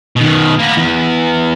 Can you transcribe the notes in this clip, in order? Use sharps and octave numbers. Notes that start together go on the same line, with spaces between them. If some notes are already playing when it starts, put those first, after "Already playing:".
B2 D#3
A#3 B3
E2